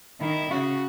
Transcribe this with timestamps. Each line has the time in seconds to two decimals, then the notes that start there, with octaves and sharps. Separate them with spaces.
0.21 D#3 E4
0.51 C#3 F#4